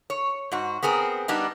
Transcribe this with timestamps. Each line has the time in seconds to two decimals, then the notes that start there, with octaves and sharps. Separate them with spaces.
0.10 C#5
0.52 G#2 F#4
0.83 B3 C4 G#4 A#4
1.28 G3 B3 D4 D#4